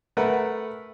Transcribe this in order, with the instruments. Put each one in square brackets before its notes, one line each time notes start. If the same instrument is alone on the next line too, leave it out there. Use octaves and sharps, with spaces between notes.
[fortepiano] A3 A#4 B4 F#5